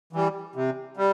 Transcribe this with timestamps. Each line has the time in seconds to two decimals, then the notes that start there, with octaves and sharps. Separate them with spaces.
0.13 E3 G3
0.55 C3
0.97 G3